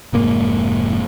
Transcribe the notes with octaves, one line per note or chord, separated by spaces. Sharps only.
F1 G#2 A#3